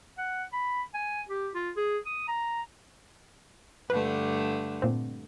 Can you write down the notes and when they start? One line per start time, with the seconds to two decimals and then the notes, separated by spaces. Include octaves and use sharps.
0.18 F#5
0.53 B5
0.94 G#5
1.29 G4
1.55 F4
1.77 G#4
2.06 D#6
2.28 A#5
3.90 G2 D3 A3 B4
4.82 A#2 C4